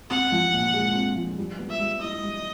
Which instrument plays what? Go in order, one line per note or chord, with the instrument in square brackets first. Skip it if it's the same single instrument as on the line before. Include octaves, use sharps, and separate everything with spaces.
[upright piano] C4 [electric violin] F#5
[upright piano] F3
A#2
G#3
C4
F3
G3
B3
[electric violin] E5
[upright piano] G3
[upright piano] E4 [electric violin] D#5
[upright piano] G3